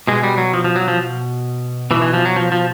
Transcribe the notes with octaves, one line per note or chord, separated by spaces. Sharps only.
B2 G#3
G3
F#3
F3
F3
F#3
F3
B2 E3
E3
F3
F#3
F3
F3